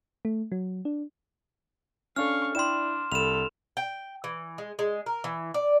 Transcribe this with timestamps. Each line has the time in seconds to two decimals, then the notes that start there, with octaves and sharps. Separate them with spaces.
0.25 A3
0.52 F#3
0.85 D4
2.16 C#4 D4 A4 F5 C#6 F6
2.55 D4 E4 D5 G5 C6 E7
3.12 C2 A4 B5 E7 F7
3.77 G5
4.24 E3
4.58 G#3
4.79 G#3
5.06 A#4
5.24 E3
5.54 D5